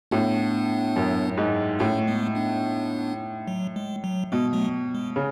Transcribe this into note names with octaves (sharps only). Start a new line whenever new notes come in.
A2 B3 D4
F#2
G#2
A2 A3 C#4
G#3 B3
B3 D4
F#3
G#3
F#3
B2 G#3
F#3 A3
G#3
C#3